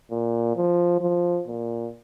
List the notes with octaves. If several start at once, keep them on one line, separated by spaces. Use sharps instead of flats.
A#2
F3
F3
A#2